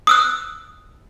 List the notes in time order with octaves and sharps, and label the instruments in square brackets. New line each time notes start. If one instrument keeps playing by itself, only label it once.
[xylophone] D#6 E6 F#6